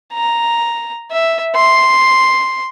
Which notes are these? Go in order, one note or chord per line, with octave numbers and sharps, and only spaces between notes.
A#5
E5
C6